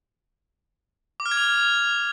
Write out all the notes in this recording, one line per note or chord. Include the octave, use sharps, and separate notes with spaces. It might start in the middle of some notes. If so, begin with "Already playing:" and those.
D6
F6
G#6
F7